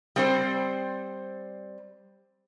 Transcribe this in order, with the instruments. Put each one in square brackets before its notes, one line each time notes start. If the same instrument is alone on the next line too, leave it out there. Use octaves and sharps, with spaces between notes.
[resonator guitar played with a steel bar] G3 C4 C5